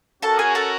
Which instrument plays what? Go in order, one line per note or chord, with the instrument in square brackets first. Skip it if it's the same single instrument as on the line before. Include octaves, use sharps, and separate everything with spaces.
[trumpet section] C#4 F#4 A#4 [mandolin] A4 A5
[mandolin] G#4 G#5
A4 A5